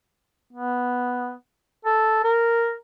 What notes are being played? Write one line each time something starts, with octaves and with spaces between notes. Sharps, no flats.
B3
A4
A#4